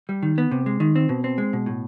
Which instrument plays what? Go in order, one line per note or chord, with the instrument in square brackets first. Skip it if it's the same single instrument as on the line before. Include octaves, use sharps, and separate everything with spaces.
[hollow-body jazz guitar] G3
D#3
B3
C3
G#3
D#3
C4
B2
C4
G#3
B2
A2